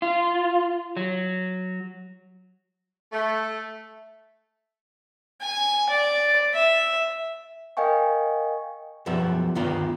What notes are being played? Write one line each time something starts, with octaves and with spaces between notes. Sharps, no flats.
F4
F#3
A3
G#5
D5
E5
A#4 D#5 F5 G5 G#5 C#6
B1 F#2 F3 G3 B3 E5
D2 G2 D#3 B3 F4 D5